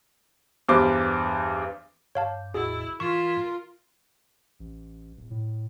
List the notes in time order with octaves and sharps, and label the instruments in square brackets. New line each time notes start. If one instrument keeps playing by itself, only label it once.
[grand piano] E2 G2 C5 D6
[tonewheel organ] G2 [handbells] C#5 F5 A5
[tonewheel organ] G#1 E2 A2 [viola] E4 [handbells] F#4 G#4
[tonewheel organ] G#2 E3 [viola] F4 A#4 [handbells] C#6
[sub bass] A1
D1
A2